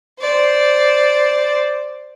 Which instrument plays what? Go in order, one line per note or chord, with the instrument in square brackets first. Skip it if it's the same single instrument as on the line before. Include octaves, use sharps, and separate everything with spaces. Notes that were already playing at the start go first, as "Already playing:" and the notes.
[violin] C5 D5